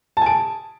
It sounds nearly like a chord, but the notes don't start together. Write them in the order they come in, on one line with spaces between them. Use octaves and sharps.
A5 G#5 D7